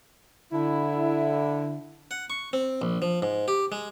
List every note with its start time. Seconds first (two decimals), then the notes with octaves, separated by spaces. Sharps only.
0.52 D3 E4
2.11 F#5
2.30 C#6
2.53 C4
2.82 A#1
3.02 F3
3.22 G#2
3.48 G4
3.72 G#3